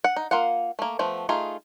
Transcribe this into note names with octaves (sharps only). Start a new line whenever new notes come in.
F#5
D#4
A#3 F4 F5 F#5
A3 A#3
F3 A3 B3
A3 D#4 F4 G#4